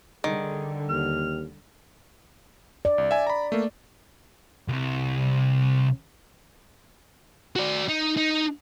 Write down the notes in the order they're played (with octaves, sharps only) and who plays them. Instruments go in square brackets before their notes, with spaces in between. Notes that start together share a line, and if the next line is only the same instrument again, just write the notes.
[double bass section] D3 G3 [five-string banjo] D#3 [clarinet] G#4
[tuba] D#2 [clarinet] F6
[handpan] D5
[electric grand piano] C2
E5 G#5
A#5 B5
A3 A#3
[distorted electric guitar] C2 C3
F#4 D5
D#4
D#4